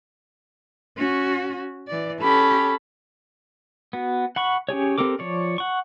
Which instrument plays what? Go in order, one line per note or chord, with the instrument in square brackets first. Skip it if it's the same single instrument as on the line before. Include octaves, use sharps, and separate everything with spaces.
[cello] C#4 F#4
E3 D5
[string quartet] C#4 A4 B5 [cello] G4
[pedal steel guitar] B3 F#4
F#5 B5 C#6
C#4 G4 G#4 C#5
C4 G4 A4 A#4 D6
F3 C#5 D5
F#5 C#6